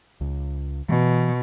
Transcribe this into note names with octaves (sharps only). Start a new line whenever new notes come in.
C#2
B2 E3